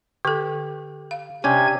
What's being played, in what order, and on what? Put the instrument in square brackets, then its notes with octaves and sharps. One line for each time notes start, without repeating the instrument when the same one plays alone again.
[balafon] D3 A4 [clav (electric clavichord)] G4
[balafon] F5
[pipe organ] C3 G#5 G#6 [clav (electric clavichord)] C#4 D4 G4